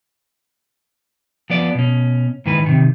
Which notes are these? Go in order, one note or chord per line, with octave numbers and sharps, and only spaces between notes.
F3 B3 D5
B2 C#4
G#2 D#3 E3 B4
C3 D#3